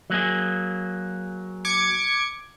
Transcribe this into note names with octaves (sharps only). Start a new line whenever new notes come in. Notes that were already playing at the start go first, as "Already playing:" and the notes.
F#3 A#3 G#4
D6 G#6 C#7